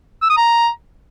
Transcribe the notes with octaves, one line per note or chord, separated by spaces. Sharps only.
E6
D#6
A#5